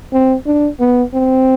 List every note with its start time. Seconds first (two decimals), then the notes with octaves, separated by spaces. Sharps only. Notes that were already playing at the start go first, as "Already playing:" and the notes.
0.13 C4
0.46 D4
0.80 B3
1.14 C4